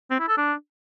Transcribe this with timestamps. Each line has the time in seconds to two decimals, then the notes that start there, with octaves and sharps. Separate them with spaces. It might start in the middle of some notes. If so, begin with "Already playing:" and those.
0.11 C4
0.20 E4
0.29 A4
0.37 D4